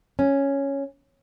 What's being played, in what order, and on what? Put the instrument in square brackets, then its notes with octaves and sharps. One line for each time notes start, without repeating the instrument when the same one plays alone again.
[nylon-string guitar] C#4